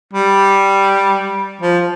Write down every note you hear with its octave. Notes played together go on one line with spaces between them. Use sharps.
G3
F3